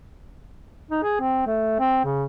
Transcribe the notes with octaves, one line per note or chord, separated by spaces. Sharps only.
D#4
G#4
C4
A3
C4
C#3